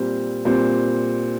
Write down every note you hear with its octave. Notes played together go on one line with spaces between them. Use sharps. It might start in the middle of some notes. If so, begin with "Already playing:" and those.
Already playing: A#2 G3 C4
A#2 G3 C4